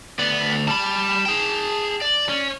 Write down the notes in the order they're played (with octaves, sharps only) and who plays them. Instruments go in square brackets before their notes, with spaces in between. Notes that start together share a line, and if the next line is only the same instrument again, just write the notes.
[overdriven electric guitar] D2 D5 [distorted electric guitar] B3
[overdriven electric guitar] G3 B5 [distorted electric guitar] A5
[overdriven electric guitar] G#4 G5
D5
[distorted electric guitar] C#4